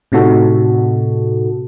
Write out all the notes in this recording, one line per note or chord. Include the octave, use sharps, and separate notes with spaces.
A2 C3 D#4 F#4 A4